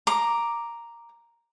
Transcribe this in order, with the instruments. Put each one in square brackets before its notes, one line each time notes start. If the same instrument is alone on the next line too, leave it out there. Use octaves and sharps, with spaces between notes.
[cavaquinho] A#5 D6